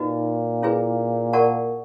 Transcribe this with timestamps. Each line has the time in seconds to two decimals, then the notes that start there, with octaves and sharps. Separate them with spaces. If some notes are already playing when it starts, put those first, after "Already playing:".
Already playing: A#2 D#4 F#4 B4 D#5
0.62 C#4 E4 G#4 B4
1.33 A#4 D5 F#5 A5 C#6